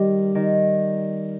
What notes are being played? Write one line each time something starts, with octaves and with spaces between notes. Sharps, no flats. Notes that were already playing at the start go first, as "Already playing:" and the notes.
Already playing: D#3 G3
D#3